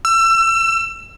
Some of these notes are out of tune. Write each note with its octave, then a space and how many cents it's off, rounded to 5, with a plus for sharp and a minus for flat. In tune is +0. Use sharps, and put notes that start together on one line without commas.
E6 +30